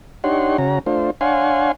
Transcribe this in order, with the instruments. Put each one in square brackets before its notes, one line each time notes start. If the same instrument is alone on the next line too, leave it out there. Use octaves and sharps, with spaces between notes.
[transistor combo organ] D4 D#4 G4 C#5 F#5 C6
C#3 C#4 F#4 A#5
A3 D4 F4 C5
D4 C#5 F5 F#5 G#5 C6